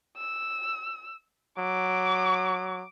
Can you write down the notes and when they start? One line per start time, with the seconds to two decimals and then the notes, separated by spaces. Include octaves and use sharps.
0.17 E6
1.59 F#3 D6